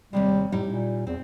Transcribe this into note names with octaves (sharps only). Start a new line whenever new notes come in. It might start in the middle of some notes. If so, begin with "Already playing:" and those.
D#2 C3 G3 G#3
A2 G3 D#4 E4
A#2
E2 C4